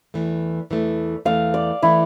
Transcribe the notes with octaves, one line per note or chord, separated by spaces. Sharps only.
E2 E3 A3
E2 E3 A3
E2 E3 A3 F5
D5
E3 A3 E4